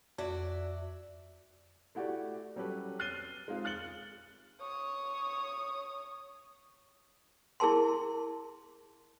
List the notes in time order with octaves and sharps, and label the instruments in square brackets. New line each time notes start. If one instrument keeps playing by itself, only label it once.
[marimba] F2 [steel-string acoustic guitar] F#4 D5 E5
[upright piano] A3 E4 F#4 G4 D5
F#3 G3 C#4 G4 A4 B4
F6 F#6 A6 C7 D#7 G7
G#3 C4 D#4 F4 G#4
F6 F#6 A6 C#7 F#7 G7
[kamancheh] C#5 D#6
[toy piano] E4 G#4 A#4 A5 C6